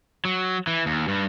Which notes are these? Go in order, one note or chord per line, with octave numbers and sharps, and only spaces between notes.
F#3
E3
D#2
G2